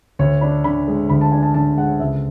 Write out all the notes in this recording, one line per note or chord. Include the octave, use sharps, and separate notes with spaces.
D2 C#5
D4 B5
D3 B5
G#3
D2 B5
A5
D4 G#5
A5
D3 A5
G#3 F#5
C#2 E5